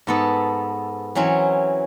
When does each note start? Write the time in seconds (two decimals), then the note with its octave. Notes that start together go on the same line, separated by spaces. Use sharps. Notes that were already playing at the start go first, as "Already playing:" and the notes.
0.07 G#2 B3 A4
1.15 E3 F#3 C4 C#4